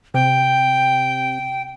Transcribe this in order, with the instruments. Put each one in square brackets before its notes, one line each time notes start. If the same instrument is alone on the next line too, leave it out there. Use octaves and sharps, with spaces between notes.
[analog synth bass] C3 [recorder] G5